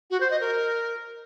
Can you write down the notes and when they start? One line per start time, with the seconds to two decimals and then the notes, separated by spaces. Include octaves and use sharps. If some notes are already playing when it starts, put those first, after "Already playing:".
0.10 F#4
0.20 C5
0.30 D#5
0.40 A#4